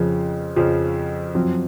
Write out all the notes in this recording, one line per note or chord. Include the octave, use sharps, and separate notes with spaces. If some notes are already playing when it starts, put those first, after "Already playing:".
Already playing: F2 C#3 F3
F2 C#3 F3
F#2 F3 C4 F#4